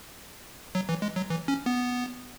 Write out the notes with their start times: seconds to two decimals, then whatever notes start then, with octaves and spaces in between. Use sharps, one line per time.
0.75 F#3
0.89 E3
1.02 G#3
1.16 F#3
1.30 E3
1.48 C#4
1.66 B3